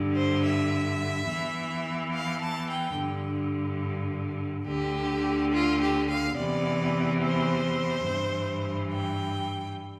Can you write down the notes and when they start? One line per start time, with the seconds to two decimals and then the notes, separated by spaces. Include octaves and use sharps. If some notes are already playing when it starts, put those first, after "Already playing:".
Already playing: G2 D3
0.15 C5
0.44 E5
1.29 E2 E3
2.14 F5
2.42 A5
2.69 G5
2.98 G2 D3
4.67 D2 D3 G4
5.52 F4
5.81 G4
6.09 F5
6.37 E2 C3 E3 D5
7.22 C5
8.07 G2 E3
8.91 G5